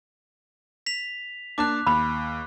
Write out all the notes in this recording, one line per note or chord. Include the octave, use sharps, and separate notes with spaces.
B6 F7
A#3 D4 A5 D6 F#6
D#2 B5